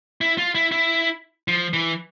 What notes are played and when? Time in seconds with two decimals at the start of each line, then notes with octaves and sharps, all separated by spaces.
0.21 E4
0.38 F4
0.55 E4
0.72 E4
1.48 F3
1.74 E3